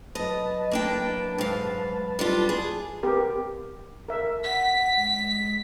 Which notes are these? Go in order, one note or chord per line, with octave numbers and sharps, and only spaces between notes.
F#2 B4 D#5 A5
A#3 D4 G5
G#2 F5
G3 D4 F4
G#4
B3 G4 A#4
A#4 E5
F#5 B6
G#3